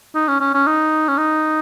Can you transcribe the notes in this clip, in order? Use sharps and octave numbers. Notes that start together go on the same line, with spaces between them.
D#4
C#4
C#4
C#4
D#4
C#4
D#4